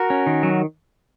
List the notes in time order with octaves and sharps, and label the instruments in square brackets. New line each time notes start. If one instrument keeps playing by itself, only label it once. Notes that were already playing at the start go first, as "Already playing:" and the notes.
Already playing: [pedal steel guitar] F#4 A#4
C#4
D#3
F#3